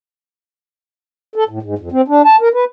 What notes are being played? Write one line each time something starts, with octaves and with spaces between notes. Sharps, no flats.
A4
A2
G#2
F2
C4
D4
A5
A#4
B4